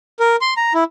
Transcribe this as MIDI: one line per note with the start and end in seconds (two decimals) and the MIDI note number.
0.20 0.36 70
0.41 0.54 84
0.57 0.73 82
0.74 0.84 64